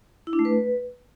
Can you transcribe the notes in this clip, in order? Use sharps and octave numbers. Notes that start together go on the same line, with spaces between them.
E4
D4
A3
B4